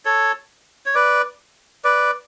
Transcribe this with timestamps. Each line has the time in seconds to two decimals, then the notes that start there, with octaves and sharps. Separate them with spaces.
0.05 A4 C#5
0.86 C#5
0.95 B4 D5
1.84 B4 D5